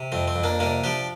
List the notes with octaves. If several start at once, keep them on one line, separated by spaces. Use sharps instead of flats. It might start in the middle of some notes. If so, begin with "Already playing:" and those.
Already playing: C3
F2 C4
C4
F2
A#3 D4
C3 A#3 D4
F3 D4 G4